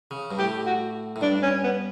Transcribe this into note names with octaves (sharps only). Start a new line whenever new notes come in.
C#3
G2
A2 G4
F#4
A2
G2 D4
C#4
B3